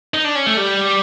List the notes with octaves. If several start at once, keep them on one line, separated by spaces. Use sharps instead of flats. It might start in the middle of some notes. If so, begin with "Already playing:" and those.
D#4
D4
C#4
A3
G3